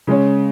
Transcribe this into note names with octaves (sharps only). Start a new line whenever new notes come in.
C#3 G#3 C#4